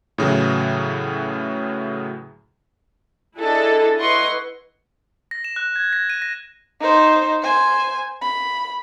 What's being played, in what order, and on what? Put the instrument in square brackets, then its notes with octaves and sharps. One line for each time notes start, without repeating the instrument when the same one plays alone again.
[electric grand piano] A2 C#3 E3 F#3
[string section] D4 E4 G#4 A4 D#5
E4 B4 D#5 F#5 C6 C#6
[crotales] A#6
E7
F#6
G#6
A#6
D#7
A#6
[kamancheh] D#4 C5
C5 G#5
B5